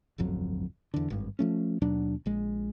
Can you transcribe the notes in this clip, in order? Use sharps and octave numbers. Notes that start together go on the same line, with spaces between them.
D1 G1 F2 F#3
E2 D3
G#1 G2
F3 A3 C#4
D#2 B2 F#3 D4
A#1 G#3